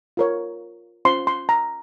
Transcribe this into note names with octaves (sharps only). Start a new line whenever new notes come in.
F4 A#4 C#5
C#4 F4 C5 C6
C6
A#5